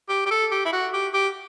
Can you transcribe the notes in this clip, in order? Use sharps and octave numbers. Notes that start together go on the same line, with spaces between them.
G4
G4
A4
G4
E4
F#4
G4
G4